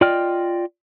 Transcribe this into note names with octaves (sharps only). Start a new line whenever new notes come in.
F4 D5 D#5 G5 F6